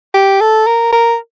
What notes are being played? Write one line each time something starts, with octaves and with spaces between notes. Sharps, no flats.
G4
A4
A#4
A#4